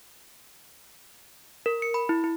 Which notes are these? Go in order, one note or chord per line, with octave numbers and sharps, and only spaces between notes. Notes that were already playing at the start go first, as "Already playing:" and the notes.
A#4
C#7
B5
E4
E4